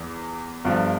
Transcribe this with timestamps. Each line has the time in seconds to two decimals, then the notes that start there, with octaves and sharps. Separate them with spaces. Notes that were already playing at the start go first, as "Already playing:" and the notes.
Already playing: E2 E3
0.65 G1 G2 F3